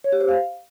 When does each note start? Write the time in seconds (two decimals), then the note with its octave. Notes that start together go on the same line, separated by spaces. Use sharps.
0.04 C#5
0.12 G4
0.21 C5
0.29 F5